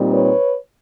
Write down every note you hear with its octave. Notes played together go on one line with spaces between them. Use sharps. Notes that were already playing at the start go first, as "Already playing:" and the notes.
Already playing: A#2 G3 C4 D#4
B4 C#5